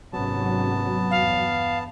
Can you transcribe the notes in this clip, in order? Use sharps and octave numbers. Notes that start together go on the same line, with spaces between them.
G#1 C3 F#3 B3 C#4 A5
E2 G2 F5